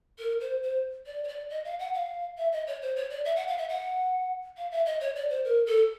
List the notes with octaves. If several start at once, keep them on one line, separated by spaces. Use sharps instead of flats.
A#4
C5
C5
D5
C#5
D5
D#5
F5
F#5
F5
E5
D#5
C#5
C5
C#5
D5
E5
F#5
F5
E5
F#5
F5
E5
D#5
C#5
D5
C5
A#4
A4